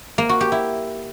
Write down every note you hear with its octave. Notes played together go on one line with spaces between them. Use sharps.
A#3
F#4
G4
E4